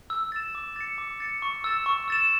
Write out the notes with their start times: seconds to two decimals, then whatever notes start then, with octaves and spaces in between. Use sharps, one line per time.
0.10 E6
0.32 A6 E7
0.55 D6
0.76 A6 C#7
0.98 D6
1.20 A6 C#7
1.42 C#6
1.64 E6 A6 E7
1.86 C#6
2.08 E6 A6 E7